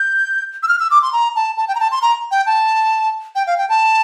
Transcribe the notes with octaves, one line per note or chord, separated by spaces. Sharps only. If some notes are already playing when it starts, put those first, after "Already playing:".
Already playing: G6
E6
F6
E6
D6
C6
A#5
A5
A5
G5
A#5
A5
C6
A#5
G5
A5
G5
F5
G5
A5